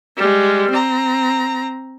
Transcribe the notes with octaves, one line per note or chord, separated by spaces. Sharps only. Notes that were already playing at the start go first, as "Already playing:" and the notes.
G3 G#3
C4 A#5